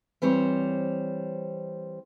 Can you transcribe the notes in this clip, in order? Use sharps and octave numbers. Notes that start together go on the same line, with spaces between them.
E3 G3 C4 C5 C#5